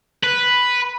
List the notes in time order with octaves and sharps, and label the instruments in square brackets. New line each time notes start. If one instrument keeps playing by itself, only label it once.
[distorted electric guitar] B4